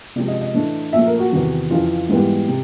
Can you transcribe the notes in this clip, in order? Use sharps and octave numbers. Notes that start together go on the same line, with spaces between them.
C3 F3 G#3 D5
D#5
D#5
A2 E3 A3 D4
A#2 F3 A3 E5
A#4
F#4
E2 C3 D#3
F2 C#3 E3 F4
G#2 E3 G3 B3
C3